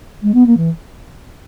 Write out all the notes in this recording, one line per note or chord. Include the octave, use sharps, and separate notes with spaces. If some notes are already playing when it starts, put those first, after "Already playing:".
G#3
B3
A#3
E3